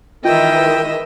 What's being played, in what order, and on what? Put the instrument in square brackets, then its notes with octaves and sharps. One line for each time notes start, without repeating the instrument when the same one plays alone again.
[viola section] D#3 E3 G#3 [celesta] F4 [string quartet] D#5 E5 [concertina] G5